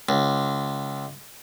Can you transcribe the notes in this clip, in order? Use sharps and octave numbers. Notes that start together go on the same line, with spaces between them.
C#2